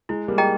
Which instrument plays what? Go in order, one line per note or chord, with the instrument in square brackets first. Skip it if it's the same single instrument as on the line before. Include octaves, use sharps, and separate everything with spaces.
[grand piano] G#3 [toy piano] E4
[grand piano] G3 A#3
[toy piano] G#4 D#5 G5 A#5